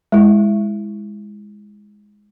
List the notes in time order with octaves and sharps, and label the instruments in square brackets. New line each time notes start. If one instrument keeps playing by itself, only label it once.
[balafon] G#3 E4